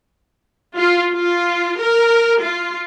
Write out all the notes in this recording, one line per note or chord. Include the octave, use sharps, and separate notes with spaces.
F4
F4
A#4
F4